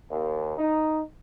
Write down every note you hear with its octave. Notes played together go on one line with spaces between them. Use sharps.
D#2
D#4